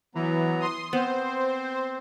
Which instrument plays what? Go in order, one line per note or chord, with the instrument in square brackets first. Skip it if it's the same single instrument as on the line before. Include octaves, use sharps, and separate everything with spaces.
[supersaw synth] E3 [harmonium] F#3 B3 A#5
[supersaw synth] C6 D#6
[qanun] B3 [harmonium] C4 [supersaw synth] C5